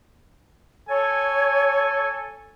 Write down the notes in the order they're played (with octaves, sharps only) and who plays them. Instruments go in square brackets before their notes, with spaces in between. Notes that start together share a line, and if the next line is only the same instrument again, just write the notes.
[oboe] A4 [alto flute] C#5 [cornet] G#5